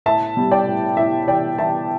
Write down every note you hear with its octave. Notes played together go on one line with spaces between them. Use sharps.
A2 E5 A5
G3
D5 G5
A2
A2 E5
E3 D5 G5
E3 E5 A5